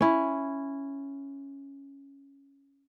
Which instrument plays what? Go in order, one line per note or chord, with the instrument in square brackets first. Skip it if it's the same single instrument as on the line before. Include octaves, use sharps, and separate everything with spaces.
[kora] C#4 E4